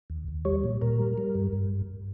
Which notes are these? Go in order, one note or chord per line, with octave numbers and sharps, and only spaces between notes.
D#2
D#2
G3 C#5
A#2
A#2 A#4
G3
G3
G2
G2